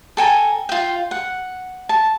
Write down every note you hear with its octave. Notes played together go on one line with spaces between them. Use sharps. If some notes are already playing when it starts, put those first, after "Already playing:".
A4 G5 G#5 A#5
F4 G5
F#5
A5